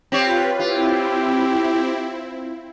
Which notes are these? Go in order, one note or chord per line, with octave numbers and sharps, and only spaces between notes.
C4 F4 G4 B4 C#5
C4 E4 F4 G4